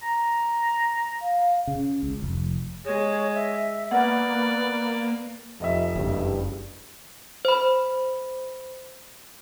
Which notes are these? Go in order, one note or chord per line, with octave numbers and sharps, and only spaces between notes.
A#5
F5
C#3
C#2
F1
G#3 C#5
E5
A#3 B3 D5 F#5
F1 F3 D#5 E5
F#1 G2
C5 B5